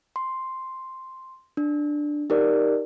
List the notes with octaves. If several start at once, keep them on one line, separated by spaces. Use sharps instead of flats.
C6
D4
D#4 G4 A#4 D5